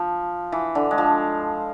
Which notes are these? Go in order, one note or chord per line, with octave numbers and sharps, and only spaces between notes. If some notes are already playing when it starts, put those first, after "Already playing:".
Already playing: F3
E3
D3
G#3
F3